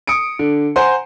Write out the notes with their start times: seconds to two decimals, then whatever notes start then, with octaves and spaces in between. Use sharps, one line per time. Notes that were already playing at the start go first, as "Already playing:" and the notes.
0.07 D#6 C#7 D7
0.39 D3
0.76 C5 F#5 G#5 A#5 C6